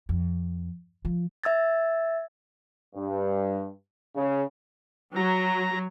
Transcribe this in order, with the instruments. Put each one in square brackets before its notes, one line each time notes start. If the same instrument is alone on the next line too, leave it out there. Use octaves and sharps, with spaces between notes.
[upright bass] F2
F3
[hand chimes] E5 E6 G#6 A6
[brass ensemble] G2
C#3
[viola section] F#3 [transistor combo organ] A#5